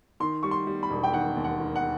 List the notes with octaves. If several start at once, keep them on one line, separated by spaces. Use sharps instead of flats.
D#3 C6
G3 C#6
C6
G3
B5
E1
G5
D#3 F#5
D#2
F#5
D#3
F#5